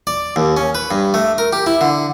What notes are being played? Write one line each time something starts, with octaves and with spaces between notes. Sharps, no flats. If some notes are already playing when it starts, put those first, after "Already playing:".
D5
D#2
C#4
B4
G2
A3
A#4
G4
E4
D3